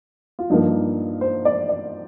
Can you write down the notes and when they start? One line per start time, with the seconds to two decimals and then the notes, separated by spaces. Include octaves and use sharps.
0.39 F4
0.50 G2 F3 A#3 D#4
1.21 C5
1.45 D5
1.69 D5